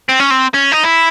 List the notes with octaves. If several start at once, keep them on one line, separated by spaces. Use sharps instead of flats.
C4
C#4
C4
C#4
D#4
E4